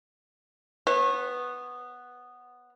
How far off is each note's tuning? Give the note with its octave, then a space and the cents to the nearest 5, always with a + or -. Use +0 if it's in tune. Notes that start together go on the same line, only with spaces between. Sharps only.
B3 +0 C#5 -30